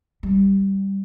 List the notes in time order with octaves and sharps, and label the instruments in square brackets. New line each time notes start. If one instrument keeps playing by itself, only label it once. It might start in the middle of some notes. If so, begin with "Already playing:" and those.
[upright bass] G3